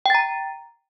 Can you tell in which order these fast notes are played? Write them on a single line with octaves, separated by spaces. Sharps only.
G5 A6 A#5